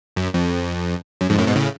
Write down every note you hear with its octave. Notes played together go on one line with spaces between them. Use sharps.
F#2
F2
F#2
F2 G#2
F#2 A2
G#2 B2
A2 C#3